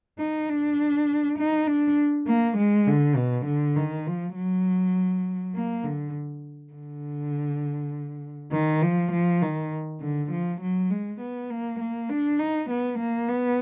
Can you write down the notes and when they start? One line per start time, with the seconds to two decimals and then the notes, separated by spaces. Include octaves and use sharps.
0.18 D#4
0.49 D4
1.38 D#4
1.67 D4
2.27 A#3
2.57 G#3
2.87 D3
3.16 B2
3.46 D3
3.76 D#3
4.06 F3
4.35 F#3
5.55 A#3
5.84 D3
6.73 D3
8.52 D#3
8.82 F3
9.12 F3
9.42 D#3
10.01 D3
10.31 F3
10.61 F#3
10.90 G#3
11.20 B3
11.50 A#3
11.80 A#3
12.09 D4
12.39 D#4
12.70 B3
12.99 A#3
13.28 B3